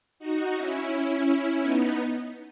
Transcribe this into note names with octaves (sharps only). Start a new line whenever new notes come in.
D#4 F#4
C#4 E4
B3 D#4